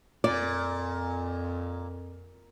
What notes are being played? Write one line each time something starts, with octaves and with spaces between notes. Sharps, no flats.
F2 A#2 D5